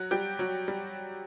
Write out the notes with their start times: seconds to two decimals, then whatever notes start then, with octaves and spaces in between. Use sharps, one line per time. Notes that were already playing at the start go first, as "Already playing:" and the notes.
Already playing: F#3 F#4
0.11 G3 G4
0.39 F#3 F#4
0.68 G3